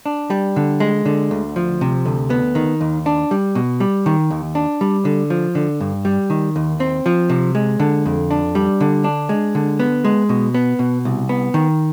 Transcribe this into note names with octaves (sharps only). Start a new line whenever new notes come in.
D4
G3
D3
G#3
D3
D2
F3
C3
D2
B3
D#3
D#2
D4
G3
B2
G3
D#3
D#2
D4
G3
D3
F3
D3
G2
G3
D#3
D#2
C4
F3
C3
G#3
D3
F2
D4
G3
D3
D4
G#3
D3
B3
G#3
B2
B3
B2
C2
B3
D#3